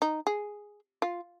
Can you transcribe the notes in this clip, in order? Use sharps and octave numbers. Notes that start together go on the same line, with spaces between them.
D#4
G#4
F4